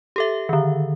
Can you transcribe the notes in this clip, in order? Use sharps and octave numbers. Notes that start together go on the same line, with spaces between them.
G4 A4 E5
D3 D#3